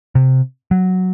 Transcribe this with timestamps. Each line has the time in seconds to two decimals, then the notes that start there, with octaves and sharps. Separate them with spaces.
0.15 C3
0.71 F#3